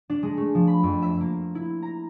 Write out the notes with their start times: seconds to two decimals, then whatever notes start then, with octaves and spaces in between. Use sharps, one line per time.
0.10 D4
0.23 G#3
0.37 A3
0.55 F3
0.67 B5
0.83 F2
1.02 E5
1.21 A#3
1.55 E4
1.82 A#5